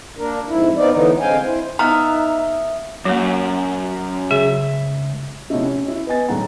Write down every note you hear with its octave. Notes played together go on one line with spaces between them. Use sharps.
A#3 D4 A#4
F2 G#2 E4
F2 B3 C4 D#4 F4 D5
A2 D3 E3 B3 D#4
D3 G#3 C4 F5 G5 G#5
E4 C5
B3 D#4 E5 F5 A#5
F#2 F#3 A#3
C#2 G#4 E5
C3 F3 A3 C#4 D#4 E4
C#4 G4
E4
B3 D#5 G#5 A6
D#1 A#1 D#2 A3 F#5 A#5